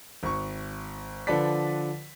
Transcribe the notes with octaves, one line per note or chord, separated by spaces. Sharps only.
G#1 C#6
D3 F3 A4 B4 D5 B6